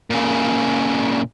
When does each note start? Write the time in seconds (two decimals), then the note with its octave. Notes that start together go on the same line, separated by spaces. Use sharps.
0.10 A#2 C#3